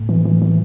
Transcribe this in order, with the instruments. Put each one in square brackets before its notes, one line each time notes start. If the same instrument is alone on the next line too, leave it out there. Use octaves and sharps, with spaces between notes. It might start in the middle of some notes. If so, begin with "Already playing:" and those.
Already playing: [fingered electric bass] A2
[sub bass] E3
E3
E3